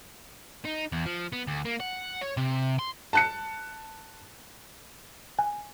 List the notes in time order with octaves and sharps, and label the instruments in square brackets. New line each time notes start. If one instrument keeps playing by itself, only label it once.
[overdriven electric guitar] D#4
E2
F3
B3
D2
A#3
F#5
C#5
C3
C6
[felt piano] A5 F#6 C#7
[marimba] G#5